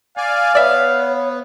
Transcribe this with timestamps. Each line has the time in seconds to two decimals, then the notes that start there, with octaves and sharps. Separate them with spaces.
0.17 D5 F5 G#5
0.55 B3 C#5 D5 E5